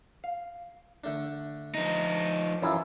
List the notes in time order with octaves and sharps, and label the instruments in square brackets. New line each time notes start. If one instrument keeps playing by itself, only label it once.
[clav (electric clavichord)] F5
[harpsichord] D3 A3 D4
[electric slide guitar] F3 D#4
[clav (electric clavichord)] F#2 E4 [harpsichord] E3 F4